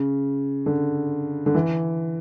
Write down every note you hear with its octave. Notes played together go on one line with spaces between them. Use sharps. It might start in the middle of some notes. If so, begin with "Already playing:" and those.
Already playing: C#3
D3
D3
E3